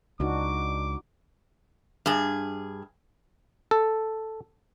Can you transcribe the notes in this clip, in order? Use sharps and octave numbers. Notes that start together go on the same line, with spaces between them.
C#2 D4 D#4 F#4 D6
G2 G#4
A4